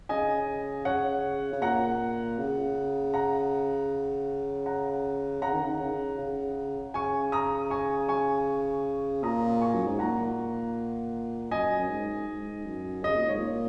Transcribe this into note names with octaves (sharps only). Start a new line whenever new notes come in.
C#3 D#5 G#5
C#3 C#5 F#5
C#3
A#2 F#5 A#5
C#3
F#5 A#5
F#5 A#5
C#3 F#5 A#5
D#3
C#3
D#3
C#3
C#3
C#3 G#5 C#6
A#5 D#6
G#5 C#6
G#5 C#6
A#2 A#5 D#6
G#5 C#6
F#2
G#2
A#2 F#5 A#5
F#2 D#5 G#5
F#2
G#2
G#2
F#2
C#3 D#5
A#2
G#2 C#5
A#2